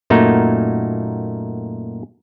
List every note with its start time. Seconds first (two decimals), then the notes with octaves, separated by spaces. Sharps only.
0.10 F#2 A#2 A3 A#3 D#4 F#4